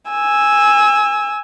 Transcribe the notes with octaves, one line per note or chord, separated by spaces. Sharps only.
G#5 E6